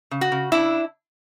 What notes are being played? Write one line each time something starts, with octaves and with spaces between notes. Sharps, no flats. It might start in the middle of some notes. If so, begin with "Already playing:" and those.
C#3
F#4
C#3
D4 E4